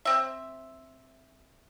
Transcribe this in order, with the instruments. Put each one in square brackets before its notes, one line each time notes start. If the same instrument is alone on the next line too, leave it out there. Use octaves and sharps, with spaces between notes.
[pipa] C4 E5